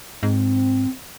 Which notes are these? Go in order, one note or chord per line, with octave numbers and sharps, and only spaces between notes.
G#2 C4